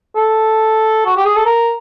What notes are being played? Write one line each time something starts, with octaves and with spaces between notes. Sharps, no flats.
A4
F#4
G4
G#4
A4
A#4